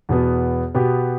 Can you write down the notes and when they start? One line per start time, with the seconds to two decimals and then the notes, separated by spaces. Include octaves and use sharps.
0.09 E2 B2 B3
0.75 B2 B3 G4